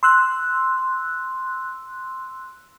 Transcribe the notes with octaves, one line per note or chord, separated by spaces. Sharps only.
C6 E6 F#6